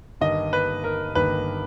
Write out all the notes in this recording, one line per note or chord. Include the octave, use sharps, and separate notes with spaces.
G1 G2 D#3 D#5
B4
A#4
G1 G2 D#3 B4